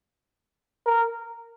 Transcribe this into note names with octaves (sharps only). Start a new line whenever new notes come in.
A#4